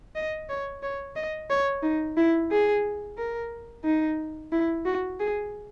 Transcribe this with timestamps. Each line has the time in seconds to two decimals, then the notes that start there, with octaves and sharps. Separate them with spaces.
0.15 D#5
0.49 C#5
0.83 C#5
1.16 D#5
1.50 C#5
1.83 D#4
2.17 E4
2.51 G#4
3.18 A#4
3.84 D#4
4.52 E4
4.85 F#4
5.20 G#4